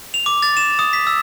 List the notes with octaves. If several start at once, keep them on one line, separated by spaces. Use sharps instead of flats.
F7
D6
A6
E7
D#6
B6
E6